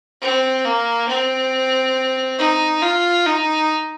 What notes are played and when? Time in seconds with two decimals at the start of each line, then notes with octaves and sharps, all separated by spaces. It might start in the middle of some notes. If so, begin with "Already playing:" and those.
0.22 C4
0.65 A#3
1.09 C4
2.39 D#4
2.82 F4
3.26 D#4